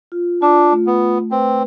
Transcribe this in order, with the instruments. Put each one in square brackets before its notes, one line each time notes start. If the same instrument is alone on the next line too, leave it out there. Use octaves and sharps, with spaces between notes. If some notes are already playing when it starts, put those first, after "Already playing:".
[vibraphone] F4
[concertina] D4 [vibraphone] F4
[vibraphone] A3
[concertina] B3
[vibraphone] A3
[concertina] C4 [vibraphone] B4